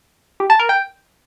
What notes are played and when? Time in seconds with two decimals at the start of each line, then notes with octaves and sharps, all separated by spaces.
0.40 G4
0.50 A5
0.59 A#4
0.69 G5